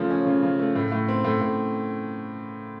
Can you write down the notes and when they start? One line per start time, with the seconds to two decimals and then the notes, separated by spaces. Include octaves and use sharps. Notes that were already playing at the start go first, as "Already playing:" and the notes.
Already playing: C#3 F3 A3 C#4
0.10 C#4
0.26 C#3
0.42 C#3
0.59 A3
0.75 A2
0.92 A2
1.08 C4
1.24 A2
1.41 A2